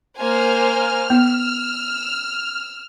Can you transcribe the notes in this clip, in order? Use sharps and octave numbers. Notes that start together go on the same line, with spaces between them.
A#3 C5 G#5 F6
B3 E6